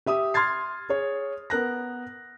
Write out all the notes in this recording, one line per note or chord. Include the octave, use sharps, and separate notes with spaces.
G4 E5 D#6
C6 F6 G#6 A6 C7
G#4 C#5
B3 A#4 F#6 A#6